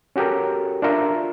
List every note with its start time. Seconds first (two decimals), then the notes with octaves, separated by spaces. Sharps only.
0.16 C#4 F#4 G4 A4 A#4
0.82 D4 F4 A#4 E5